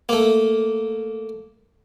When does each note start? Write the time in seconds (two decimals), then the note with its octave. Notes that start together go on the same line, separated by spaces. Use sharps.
0.09 A3 A#3